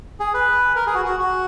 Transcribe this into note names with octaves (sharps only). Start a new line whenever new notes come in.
G#4
B4
A#4
G#4
F#4
F#4
F#4